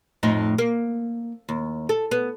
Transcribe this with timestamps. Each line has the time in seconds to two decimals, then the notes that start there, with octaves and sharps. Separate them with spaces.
0.23 F2 A2 D#4
0.58 A#3
1.49 D#2
1.89 A4
2.11 B3